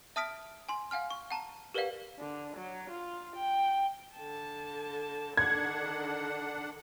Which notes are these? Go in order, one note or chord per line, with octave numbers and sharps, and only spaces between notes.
E5 A5 D#6 F6 B6 D7
G#5 C6
F5 F#5 G#5 F6
C#6
F#5 A5 A#5
G4 A#4 B4 D5 F5 F#5
D3
F#3
F4
G5
D3 A5
D3 D#3 D4 F#5 G#6